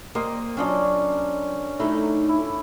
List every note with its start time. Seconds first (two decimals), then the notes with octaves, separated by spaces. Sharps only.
0.15 A#3 G4 A#4 C5 D#5
0.57 F#3 C#4 D4 F4 D#5
1.80 F#3 A3 D#4 E4
2.29 E4